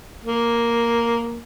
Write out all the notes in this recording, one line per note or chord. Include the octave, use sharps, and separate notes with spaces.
A#3